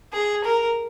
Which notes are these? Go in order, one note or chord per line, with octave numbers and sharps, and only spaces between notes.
G#4
A#4